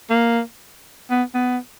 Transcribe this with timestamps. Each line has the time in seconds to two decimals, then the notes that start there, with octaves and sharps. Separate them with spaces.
0.10 A#3
1.10 B3
1.34 B3